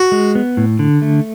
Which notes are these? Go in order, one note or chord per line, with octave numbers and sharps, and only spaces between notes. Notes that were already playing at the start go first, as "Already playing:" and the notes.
Already playing: F#4
G#3
B3
A2
D3
A3